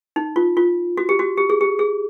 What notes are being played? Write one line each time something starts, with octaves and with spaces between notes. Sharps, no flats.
D#4
F4
F4
F#4
G4
F#4
G4
G#4
G4
G#4